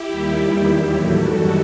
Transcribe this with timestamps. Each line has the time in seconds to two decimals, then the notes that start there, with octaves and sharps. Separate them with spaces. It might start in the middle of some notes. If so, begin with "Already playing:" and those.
Already playing: E4 G4
0.08 D#2 D#3 G3
0.38 E2 D#3 G3
0.67 D#2 D#3 F#3
0.96 A2 E3 G3 F#4 A4
1.26 F#2 D#3 G3 F#4 A4